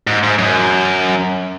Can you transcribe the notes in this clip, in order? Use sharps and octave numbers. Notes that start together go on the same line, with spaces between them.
G#2
G#2
F#2